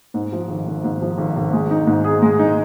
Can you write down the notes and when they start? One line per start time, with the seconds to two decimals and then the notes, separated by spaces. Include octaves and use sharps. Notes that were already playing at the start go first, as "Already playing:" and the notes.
0.14 G#2
0.32 F3
0.49 G#1
0.66 G#1
0.84 G#2
1.02 F3
1.18 G#1
1.36 G#1
1.53 G#3
1.71 D#4
1.87 G#2
2.04 G#4
2.22 G#3
2.39 D#4